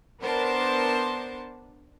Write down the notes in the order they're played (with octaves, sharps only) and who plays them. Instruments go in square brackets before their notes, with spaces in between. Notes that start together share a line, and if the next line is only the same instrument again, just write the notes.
[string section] B3 D4 A#4 C5 A5